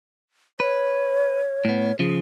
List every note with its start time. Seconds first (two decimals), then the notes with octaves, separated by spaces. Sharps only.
0.60 B4 C#5
1.65 A2 B3
1.99 C#3 F3 G#4